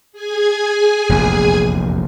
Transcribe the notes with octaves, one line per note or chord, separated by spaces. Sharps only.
G#4 G#5
F1 A#1 E2